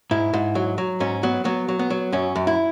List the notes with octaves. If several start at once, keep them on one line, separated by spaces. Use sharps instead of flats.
G#2 E4
G#2
F#3
F#3
G#2 C#4
F#3 B3
F#3 B3
F#3
B3
F#3
F#2 C#4
F#2
E4